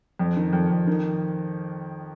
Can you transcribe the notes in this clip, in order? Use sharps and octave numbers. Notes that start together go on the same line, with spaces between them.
F2
D#3
F2
F2
D#3